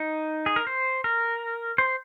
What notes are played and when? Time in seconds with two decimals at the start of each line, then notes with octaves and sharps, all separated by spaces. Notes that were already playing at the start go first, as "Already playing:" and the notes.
Already playing: D#4
0.46 G#4
0.56 A#4
0.67 C5
1.04 A#4
1.78 C5